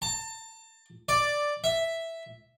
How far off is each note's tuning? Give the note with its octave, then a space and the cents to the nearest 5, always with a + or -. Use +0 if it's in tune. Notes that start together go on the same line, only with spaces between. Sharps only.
A5 +30
D5 +0
E5 +0